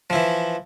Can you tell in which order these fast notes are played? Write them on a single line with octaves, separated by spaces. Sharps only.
F3 E4 E3